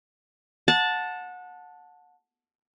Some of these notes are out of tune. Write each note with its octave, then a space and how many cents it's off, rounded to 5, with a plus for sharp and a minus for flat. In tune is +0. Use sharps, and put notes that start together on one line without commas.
F#5 -25 A5 +0